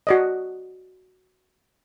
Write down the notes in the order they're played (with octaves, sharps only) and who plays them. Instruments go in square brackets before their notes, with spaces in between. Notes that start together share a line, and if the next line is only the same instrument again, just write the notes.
[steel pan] F#4 D5 D#5